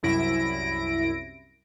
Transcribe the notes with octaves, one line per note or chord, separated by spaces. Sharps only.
C2 F#2 E4 A#6 D7